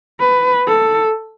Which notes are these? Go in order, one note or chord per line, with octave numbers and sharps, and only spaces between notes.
B4
A4